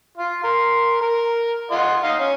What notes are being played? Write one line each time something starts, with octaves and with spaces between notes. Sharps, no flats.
F4
A#4 C6
A#4
F4 D#5 F#5
D#4 D#5 F5
C#4